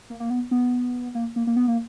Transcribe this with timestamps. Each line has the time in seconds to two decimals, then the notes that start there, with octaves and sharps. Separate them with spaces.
0.10 A#3
0.20 A#3
0.30 B3
0.51 B3
1.15 A#3
1.36 A#3
1.47 A#3
1.56 B3
1.68 A#3